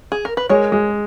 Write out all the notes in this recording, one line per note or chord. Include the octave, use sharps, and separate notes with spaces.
G#4
A#4
B4
G#3 A#4 C#5
G#3